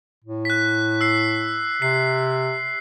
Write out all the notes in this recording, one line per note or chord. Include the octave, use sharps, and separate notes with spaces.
A2
F#6 B6
E6 C7
C3 C7